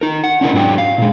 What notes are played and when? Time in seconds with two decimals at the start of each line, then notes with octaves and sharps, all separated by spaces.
0.01 D#4 A#4
0.24 F#5
0.41 C#4 D4 E4 A#4
0.54 G#2 F#3 D4 G4 G5
0.78 F5
0.98 A#2 G#3